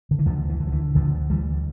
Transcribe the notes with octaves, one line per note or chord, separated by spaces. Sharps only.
D3
E3
D2 D3 F3
E3
D3
F3
E3
D2 D3 F3
D2 E3 G3